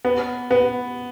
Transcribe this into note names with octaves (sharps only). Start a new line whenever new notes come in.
B3
B3